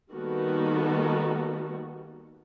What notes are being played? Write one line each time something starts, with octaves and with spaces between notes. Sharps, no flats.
D#3 G3 A#3 B3 F#4 A4